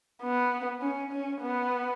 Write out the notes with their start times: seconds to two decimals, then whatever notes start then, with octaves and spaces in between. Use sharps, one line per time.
0.23 B3
0.82 C#4
1.12 C#4
1.42 B3